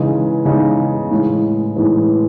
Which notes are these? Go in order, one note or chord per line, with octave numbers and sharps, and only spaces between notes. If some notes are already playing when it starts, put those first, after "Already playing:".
Already playing: C#3 E3 G#3 D#4
C#3 E3 G#3 D#4
A2 E3 G#3
A2 E3 G#3